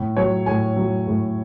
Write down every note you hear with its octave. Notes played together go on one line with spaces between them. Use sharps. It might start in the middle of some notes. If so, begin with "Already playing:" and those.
Already playing: A2
F#3 C#5
A2 G#5
F#3
A2